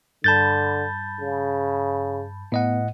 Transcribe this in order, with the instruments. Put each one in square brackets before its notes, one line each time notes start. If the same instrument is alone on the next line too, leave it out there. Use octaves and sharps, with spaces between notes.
[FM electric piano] G2 B5 [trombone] D3 [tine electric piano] A5 G6 A6
[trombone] C#3
[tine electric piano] A2 D#5 F#5 [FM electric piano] B3